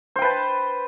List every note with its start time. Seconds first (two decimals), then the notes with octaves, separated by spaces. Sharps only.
0.16 C5
0.19 G5
0.22 B4
0.25 A5